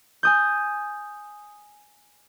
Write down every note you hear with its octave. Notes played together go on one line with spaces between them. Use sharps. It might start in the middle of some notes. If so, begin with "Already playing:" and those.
G#5 D#6 G6